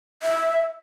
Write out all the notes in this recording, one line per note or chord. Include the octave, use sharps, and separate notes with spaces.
E5